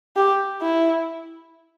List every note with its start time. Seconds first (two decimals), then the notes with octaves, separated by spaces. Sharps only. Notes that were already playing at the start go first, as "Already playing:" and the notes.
0.16 G4
0.62 E4